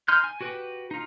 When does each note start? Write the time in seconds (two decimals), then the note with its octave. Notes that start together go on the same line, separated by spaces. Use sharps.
0.08 D#4 C6 F6 G6
0.24 G#5
0.41 F#4 G4 B4
0.91 D#4 F4